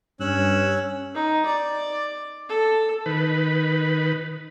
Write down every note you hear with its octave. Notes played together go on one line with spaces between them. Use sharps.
G2 C#4 E6 F#6
D#4
D5
A4
D#3 B4